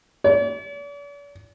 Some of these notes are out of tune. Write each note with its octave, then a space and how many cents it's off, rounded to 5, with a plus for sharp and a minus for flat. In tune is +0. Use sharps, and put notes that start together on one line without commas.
D5 -45